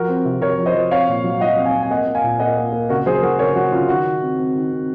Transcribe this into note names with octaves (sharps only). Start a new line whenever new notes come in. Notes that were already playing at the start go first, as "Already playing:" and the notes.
Already playing: F3 F#4 A#4
C4
C3
C3 A#4 C#5
F3
C5 D#5
F3
C4 C#5 F5
A#2
F#3
F#3 D#5 F#5
C4
F5 G#5
C4
G#5
A#3 D#5 F#5
A#3
F5 G#5
A#2
A#3 D#5 F#5
A#3
A#3
C#3 F#4 A#4
F#3 G#4 C5
F#3 F#4 A#4
C#3 A#4 C#5
F#3 F#4
C#3 F4
D#3 F#4
D#3
C4
C4
D#3
C4